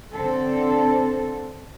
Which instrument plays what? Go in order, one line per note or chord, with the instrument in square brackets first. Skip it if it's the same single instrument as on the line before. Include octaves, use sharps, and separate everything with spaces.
[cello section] D3 C4 A4